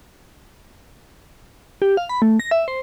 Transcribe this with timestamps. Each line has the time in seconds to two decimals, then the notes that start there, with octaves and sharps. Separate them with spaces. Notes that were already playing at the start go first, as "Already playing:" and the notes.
1.82 G4
1.97 F5
2.09 B5
2.22 A3
2.40 A#6
2.51 E5
2.68 C5